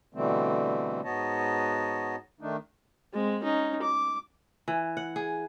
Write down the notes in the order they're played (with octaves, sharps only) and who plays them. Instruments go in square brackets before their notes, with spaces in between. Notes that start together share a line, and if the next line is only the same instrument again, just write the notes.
[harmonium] B2 D3 E3 G3 A3 C4
G#2 B3 F#4 C#5 D#5 A5
D#3 A3 D4 D#4
[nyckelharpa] G#3 C4
C#4 D#4
D6
[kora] E3
F#5
G#4